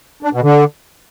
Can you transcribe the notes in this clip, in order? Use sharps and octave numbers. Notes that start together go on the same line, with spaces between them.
D4
B2
D3